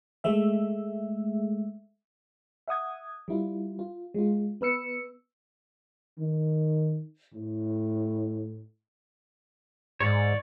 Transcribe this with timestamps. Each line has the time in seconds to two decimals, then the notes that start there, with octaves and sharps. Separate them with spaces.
0.24 G#3 A3 E5
2.68 E5 F#5 D#6 G#6
3.28 G3 E4 F4
3.79 F4
4.14 G#3 F4
4.61 B3 B4 E6 C#7
6.18 D#3
7.34 A2
10.01 G#2 C#5 D5